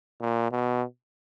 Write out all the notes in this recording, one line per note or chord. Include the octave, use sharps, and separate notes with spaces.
A#2
B2